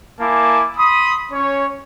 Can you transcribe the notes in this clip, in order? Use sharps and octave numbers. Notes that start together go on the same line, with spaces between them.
A#3 E4 G#5 A5 D6
B5 C6 D#6
C#4 C#5